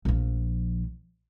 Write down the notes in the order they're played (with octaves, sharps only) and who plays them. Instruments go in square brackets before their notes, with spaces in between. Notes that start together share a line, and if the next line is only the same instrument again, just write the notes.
[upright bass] A#1 F3